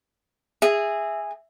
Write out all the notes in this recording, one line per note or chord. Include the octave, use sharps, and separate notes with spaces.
G#4 E5